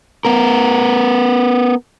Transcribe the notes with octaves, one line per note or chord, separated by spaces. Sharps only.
B3 A#4